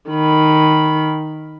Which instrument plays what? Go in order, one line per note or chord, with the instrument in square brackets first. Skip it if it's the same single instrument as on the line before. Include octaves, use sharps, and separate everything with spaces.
[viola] D#3 B5